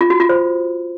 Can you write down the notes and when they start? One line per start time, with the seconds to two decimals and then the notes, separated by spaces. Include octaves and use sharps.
0.01 F4
0.10 F#4
0.20 F4
0.29 C5